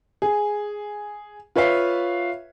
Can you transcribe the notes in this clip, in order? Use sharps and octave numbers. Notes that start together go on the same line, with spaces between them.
G#4
F4 B4 C#5 E5 F5